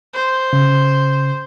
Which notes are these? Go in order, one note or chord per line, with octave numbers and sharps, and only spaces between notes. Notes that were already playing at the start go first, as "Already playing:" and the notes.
C5
C#3